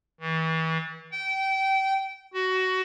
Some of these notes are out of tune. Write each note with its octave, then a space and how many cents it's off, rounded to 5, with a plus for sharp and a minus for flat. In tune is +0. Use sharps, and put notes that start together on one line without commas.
E3 -35
G5 -25
F#4 +15